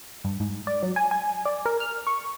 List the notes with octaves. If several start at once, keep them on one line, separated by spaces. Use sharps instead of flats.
G2
G#2
D5
F#3
G#5
G#5
D5
A#4
F6
C#6